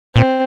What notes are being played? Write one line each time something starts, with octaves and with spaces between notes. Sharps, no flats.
A#2 C4